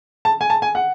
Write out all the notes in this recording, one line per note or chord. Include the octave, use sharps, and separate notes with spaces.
A5
G#5
A5
G#5
F#5